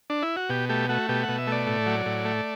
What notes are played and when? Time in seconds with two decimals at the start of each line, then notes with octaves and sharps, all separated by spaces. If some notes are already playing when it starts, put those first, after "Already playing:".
0.10 D4
0.22 E4
0.37 F#4
0.49 B2 G4
0.69 A3 G4
0.89 A3 F#4
1.09 B2 G4
1.23 F#5
1.29 B2
1.38 E5
1.47 A3 D5
1.67 A2
1.86 F#3
2.06 A2
2.25 A3